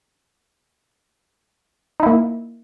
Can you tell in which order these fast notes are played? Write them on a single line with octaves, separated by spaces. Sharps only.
D#4 E4 A#3